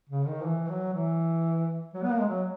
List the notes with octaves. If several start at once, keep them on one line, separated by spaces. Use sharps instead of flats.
C#3
D#3
E3
F#3
E3
F#3
B3
A#3
G#3
F#3